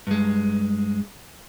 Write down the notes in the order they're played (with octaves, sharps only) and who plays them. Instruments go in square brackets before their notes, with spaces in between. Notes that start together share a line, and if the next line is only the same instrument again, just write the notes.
[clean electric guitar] G2 G#3